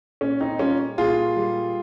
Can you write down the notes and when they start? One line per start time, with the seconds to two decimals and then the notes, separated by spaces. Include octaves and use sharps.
0.21 A#2 C#4
0.40 C4 D#4
0.59 G3 C#4 F4
0.98 A#2 F4 G#4
1.36 G3